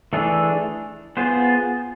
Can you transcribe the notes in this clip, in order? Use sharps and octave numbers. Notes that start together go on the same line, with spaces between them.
E3 A3 D4 G#4
B3 F4 G#4 C5